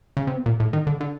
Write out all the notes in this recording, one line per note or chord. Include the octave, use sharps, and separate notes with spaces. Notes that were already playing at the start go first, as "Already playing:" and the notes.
C#3
C3
B2
A#2
A2
D#3
D3
D3